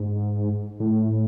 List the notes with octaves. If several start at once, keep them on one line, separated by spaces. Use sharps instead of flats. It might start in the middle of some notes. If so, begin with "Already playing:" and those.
Already playing: G#2
A2